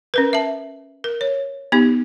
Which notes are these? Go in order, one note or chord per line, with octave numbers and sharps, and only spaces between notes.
C#4 A#4 B4
E5 A5
A#4
C#5
B3 D#4 G4